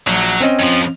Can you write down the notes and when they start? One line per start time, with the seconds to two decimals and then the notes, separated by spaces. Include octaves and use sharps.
0.07 A#1 F#3
0.41 C4 C#4 D#5
0.59 F2 F3